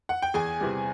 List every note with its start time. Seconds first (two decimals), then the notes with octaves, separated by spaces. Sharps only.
0.09 F#5
0.22 G5
0.34 E2 G#4 G#5
0.61 C3 E3 G3